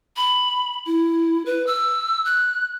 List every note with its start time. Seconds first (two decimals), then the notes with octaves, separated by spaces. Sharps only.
0.17 B5
0.86 E4
1.46 B4
1.67 E6
2.25 F#6